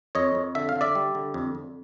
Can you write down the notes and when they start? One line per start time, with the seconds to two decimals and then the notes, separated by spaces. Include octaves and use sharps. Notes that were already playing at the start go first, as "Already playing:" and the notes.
0.15 F2 C#5 D#5
0.35 F2
0.55 D3 E5
0.69 F5
0.76 D3
0.81 D5 E5
0.95 G3
1.15 D3
1.34 F2
1.55 F2